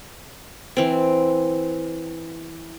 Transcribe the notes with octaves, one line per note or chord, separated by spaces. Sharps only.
E3 C4